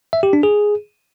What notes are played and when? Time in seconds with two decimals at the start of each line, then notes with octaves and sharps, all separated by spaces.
0.13 E5
0.23 G4
0.33 D4
0.43 G#4